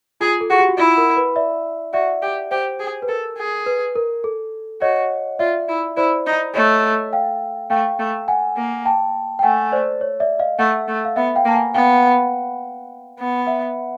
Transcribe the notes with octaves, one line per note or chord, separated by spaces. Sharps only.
F4 G#4
A4
F#4 G#4
G4
F#4
E4 F4
A#4
B4
D5 E5
F#4 D5 E5
G4
G4 C5
G#4
B4
A4 A#4
G#4
B4
A#4
A4
F#4 C#5 D#5
F4 D5 E5
E4
E4 C5 D5
D#4
A3 C#5 D#5
F5 G5
A3 F5 G5
A3
F#5 G#5
A#3
G5 A5
G5
A3 F#5 G#5
C5 D5
C#5
D5 E5
D#5 F5
A3 E5 F#5
A3
F5
B3 E5 F#5
F5 G5
A#3 A5
F#5 G#5
B3 F5 G5
B3
E5 F#5